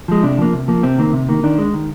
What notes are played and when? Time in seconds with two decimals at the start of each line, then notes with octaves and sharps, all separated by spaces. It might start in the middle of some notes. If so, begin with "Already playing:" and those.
0.08 F3 G#3
0.23 C3 D4
0.38 F3 A#3
0.53 C3
0.68 F3 A#3
0.83 C3 C4
0.98 D#3 A#3
1.13 C3
1.29 D#3 A#3
1.43 D#3 D4
1.59 G#3
1.74 D#3